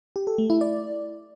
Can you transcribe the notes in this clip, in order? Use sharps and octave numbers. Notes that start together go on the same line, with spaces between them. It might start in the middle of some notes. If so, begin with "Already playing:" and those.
G4
A4
A3
E4
D5